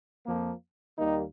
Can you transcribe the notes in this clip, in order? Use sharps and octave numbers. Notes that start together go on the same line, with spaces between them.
F2 F3 A#3
D#2 D#3 G3 A#3 D#4